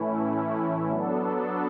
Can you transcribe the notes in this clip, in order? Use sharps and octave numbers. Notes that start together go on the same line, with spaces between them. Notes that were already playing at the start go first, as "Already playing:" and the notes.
Already playing: A2 E3 A3 C#4 E4
F#3 B3 D4 A4